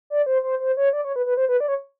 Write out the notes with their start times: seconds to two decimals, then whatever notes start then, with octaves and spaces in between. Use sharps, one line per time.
0.10 D5
0.26 C5
0.43 C5
0.60 C5
0.77 C#5
0.93 D5
1.05 C#5
1.16 B4
1.26 B4
1.37 C5
1.49 B4
1.60 D5
1.68 C#5